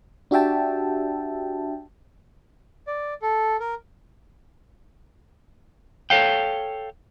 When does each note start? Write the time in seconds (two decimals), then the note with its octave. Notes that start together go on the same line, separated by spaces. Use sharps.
0.31 D4 F#4 G4 E5 G5 A5
2.87 D5
3.22 A4
3.60 A#4
6.10 A4 C#5 F5 G5